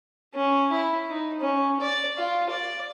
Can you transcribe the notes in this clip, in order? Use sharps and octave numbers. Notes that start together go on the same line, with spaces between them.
C#4
E4
D#4
C#4
D5
F4
D5